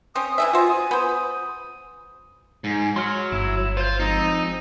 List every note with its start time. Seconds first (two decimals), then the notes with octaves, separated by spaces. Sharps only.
0.15 C4 C#4 D#6
0.38 E3 D#5 E5 G#5
0.53 F4 F#4 C5
0.70 D#6
0.91 B3 C5
2.64 G#2
2.96 F#3 C6 F6
3.32 G1 E4
3.77 F4 C5 G6
4.00 F3 G#3 C4 D#4